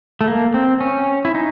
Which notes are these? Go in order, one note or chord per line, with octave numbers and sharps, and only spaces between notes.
A3
A#3
C4
C#4
E4
D#4